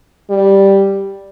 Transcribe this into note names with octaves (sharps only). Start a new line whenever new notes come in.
G3